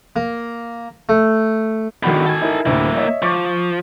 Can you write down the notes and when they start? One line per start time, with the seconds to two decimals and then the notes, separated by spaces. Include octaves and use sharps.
0.16 A#3
1.09 A3
2.03 E2 D3 D#3 F#4 B5
2.26 A4 G#5
2.41 D#4 E4 A#4
2.66 D2 A2 A#3 E4
2.95 C#5 D#5 E5
3.22 F3 C#6 D6